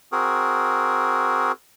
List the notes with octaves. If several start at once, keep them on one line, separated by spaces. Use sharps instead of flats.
C4 F#4 G#4 A#4